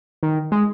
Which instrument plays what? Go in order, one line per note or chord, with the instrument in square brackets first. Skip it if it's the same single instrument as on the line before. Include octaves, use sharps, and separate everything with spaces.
[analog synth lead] D#3
G#3